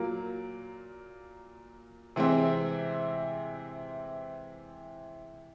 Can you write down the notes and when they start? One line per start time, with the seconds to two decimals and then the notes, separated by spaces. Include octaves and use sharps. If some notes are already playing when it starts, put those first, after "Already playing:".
Already playing: A#2 F#3 A#3
2.16 C3 E3 G#3 C4